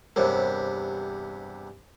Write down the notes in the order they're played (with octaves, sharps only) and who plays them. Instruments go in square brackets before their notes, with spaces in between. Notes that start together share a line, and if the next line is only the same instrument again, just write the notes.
[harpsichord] E2 G2 C3 [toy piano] A#4 C5 C#5